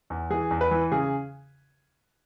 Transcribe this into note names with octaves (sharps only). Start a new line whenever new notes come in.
E2
E3 G#4
E2
B4
E3
C#3 G#4